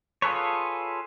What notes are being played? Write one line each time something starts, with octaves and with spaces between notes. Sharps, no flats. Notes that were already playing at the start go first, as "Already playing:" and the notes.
F4 G#4 A4 B4 C#5